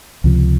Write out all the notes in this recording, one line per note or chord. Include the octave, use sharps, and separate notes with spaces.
C#2 C3 F3